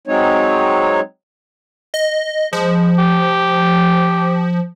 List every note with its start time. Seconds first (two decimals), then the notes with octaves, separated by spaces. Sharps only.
0.07 F#3 G#3 C4 D#4 C#5
1.94 D#5
2.53 F3 G#3
2.98 G4